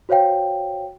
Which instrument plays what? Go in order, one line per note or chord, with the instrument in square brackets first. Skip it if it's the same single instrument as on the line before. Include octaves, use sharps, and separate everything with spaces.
[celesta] F#4 C5 C#5 F5 G5